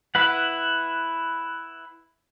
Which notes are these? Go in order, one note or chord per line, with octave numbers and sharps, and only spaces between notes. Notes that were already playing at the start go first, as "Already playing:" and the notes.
E4 B4 F#5